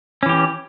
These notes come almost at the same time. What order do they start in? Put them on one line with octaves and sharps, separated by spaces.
C#4 E3 G4